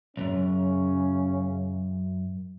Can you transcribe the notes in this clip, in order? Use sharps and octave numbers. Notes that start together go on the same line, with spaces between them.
B1 F#2 C#3 C#4